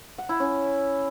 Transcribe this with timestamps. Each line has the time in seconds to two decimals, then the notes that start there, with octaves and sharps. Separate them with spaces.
0.18 F#5
0.29 E4
0.40 C#4